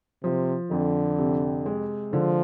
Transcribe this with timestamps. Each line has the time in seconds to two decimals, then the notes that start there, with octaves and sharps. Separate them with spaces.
0.23 C3 F3
0.71 F2 D3
1.19 C3
1.66 G#3
2.13 D3 F3